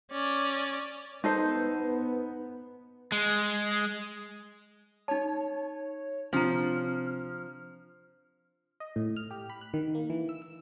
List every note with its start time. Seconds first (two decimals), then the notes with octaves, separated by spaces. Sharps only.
0.11 C#4 D5
1.24 B3 D#4 A4 C5
3.12 G#3
5.08 D#4 C#5 A5
6.33 C3 F3 D4 A#5 F6
8.80 D#5
8.96 A2
9.17 F6
9.31 G4
9.50 B5
9.61 F#6
9.74 D#3
9.95 A#3
10.10 E3
10.29 E6
10.42 E6